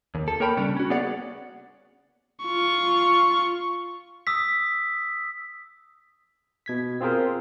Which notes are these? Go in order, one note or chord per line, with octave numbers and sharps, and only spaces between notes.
D#2
A4
A#3 A#4 C#5 G5 A#5 B5
C#3 G3 C#4 D4
C#4 F#4
A#3 B3 G#4 C#5 D5 F#5
F4 C#6
D#6 E6 B6
B2 G#6 B6
C4 F4 G#4 A#4 C5